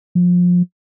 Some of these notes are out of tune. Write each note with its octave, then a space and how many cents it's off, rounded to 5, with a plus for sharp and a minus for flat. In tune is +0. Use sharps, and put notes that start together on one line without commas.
F3 +25